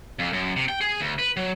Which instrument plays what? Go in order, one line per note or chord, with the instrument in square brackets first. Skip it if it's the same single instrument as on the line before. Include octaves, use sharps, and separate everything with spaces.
[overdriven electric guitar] F2
F#2
C3
G5
G#4
D2
B4
F#3